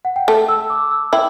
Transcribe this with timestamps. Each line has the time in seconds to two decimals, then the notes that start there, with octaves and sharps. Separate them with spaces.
0.05 F#5
0.16 G5
0.27 A3 A5
0.49 E6
0.70 D6
0.91 E6
1.13 E4 G5